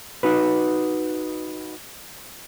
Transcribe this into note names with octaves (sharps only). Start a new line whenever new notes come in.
D#4 F#4 B4